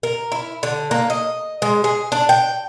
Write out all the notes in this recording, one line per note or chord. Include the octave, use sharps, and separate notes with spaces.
A#4
E4
D3
A#3
D#5
G#3
G#4
D4
G5